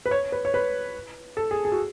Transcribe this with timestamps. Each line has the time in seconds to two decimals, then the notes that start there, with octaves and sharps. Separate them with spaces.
0.06 B4
0.11 C#5
0.32 B4
0.45 C#5
0.54 B4
1.37 A4
1.51 G#4
1.65 G#4
1.72 F#4